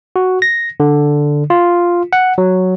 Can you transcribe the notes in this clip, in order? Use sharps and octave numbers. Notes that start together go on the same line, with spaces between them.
F#4
A#6
D3
F4
F#5
F#3